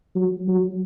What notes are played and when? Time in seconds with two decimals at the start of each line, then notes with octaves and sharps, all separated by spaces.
0.15 F#3
0.48 F#3